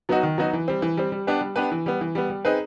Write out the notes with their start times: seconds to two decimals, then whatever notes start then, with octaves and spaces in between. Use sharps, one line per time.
0.09 F#3 B3 D#4 F#4
0.23 D#3
0.38 F#3 B3 D#4 F#4
0.53 E3
0.68 G3 C4
0.82 E3
0.97 G3 C4
1.12 G3
1.27 B3 D4 G4 B4
1.41 G3
1.56 B3 D4 G4 B4
1.71 E3
1.86 G3 B3
2.01 E3
2.15 G3 B3
2.30 G3
2.45 C4 D#4 G#4 B4